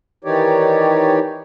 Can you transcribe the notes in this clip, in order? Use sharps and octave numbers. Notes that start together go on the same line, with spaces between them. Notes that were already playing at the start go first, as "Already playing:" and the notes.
D#3 E3 D#4 G4 C#5 D5